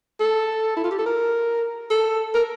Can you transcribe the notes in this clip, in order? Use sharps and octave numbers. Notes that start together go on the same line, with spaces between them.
A4
E4
F4
G4
A4
A#4
A4
A#4